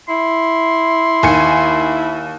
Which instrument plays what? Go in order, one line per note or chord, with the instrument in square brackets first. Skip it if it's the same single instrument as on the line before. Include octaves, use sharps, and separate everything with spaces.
[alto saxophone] E4 [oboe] C6
[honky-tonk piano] D#2 G#5 C#7